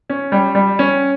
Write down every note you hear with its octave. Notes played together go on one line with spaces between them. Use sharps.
C#4
G3
G3
C#4